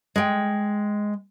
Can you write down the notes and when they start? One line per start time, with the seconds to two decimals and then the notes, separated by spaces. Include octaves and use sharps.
0.16 G#3 G5